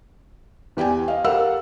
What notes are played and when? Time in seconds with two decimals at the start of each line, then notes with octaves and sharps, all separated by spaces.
0.77 E2 G4 D5 G5 G#5
1.08 D#5 F5
1.25 G4 A4 A#4 F5 F#5 E6